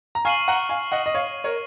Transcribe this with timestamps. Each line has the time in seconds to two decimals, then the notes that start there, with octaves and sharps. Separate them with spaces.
0.15 A#5
0.25 F5 G#5 C#6 F6 C7 D#7 F#7
0.48 F#5 A#5
0.69 F5 G#5
0.92 D#5 F#5
1.06 D#5
1.15 C#5 F5
1.44 A#4 C#5